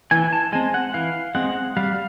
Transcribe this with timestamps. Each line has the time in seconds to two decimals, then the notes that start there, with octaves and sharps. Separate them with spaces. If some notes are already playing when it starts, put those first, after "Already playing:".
0.11 E3 G#5
0.33 A5
0.52 G#3 C4 G#5
0.74 F#5
0.94 E3 F5
1.35 G#3 C4 F#5
1.77 G3 F5